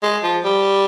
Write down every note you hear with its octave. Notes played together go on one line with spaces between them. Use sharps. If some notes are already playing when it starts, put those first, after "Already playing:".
G#3
F3
G3